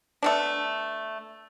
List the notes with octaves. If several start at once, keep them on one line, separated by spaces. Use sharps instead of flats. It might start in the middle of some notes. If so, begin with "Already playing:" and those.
A3 B3 D4